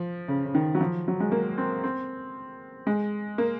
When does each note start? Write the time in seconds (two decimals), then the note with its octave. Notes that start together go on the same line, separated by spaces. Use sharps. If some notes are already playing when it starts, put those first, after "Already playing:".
Already playing: F3
0.28 C#3
0.45 C#3
0.55 D#3
0.75 F#3
0.81 F3
1.08 F#3
1.20 G#3
1.32 A#3
1.58 C4
1.84 C4
2.87 G#3
3.38 A#3